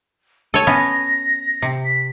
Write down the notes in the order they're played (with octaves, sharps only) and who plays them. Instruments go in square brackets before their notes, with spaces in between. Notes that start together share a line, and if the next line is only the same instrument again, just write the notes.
[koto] A4 C#5 [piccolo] D#7
[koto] B3 C#4 [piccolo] A#6
[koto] C3
[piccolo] B6